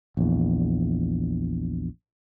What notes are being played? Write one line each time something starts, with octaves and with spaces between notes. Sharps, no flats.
A#1 E2